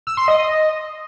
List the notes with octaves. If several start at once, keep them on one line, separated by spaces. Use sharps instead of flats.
E6
C6
D#5